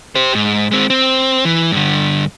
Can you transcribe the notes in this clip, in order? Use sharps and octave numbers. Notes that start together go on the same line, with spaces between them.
G4 C5
G#2
G#3 C4
C4
E3
G2 D3